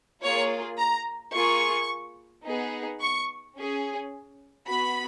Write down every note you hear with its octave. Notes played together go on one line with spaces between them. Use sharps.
A#3 F4 G#4 C#5
A#5
A#3 F4 G#4 C#6
B3 D#4 G#4
C#6
C#4 G#4
B3 F#4 B5